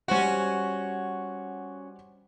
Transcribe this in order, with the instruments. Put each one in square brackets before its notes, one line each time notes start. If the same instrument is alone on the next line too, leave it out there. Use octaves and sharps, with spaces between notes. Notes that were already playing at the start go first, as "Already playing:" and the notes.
[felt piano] G3 C5 F#5 [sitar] C#4 F#4